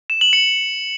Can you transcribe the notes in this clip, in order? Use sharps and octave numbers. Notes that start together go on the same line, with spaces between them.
E7
F#7
C#7